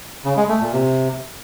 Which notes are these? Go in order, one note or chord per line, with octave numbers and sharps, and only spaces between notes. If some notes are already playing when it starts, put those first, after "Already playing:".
C#3
G#3
A3
A#2
C3